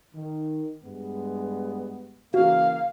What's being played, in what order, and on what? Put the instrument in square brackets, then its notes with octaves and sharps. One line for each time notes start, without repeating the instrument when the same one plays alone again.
[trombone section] D#3
G2 G#3 B3
[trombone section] C#3 E3 A#3 [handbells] F#4 [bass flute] F5